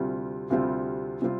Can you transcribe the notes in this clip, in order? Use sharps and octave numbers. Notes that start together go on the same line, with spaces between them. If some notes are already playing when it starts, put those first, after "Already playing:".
Already playing: D2 C3 G3 C4 F4
D2 C3 G3 C4 F4
C3 G3 C4 F4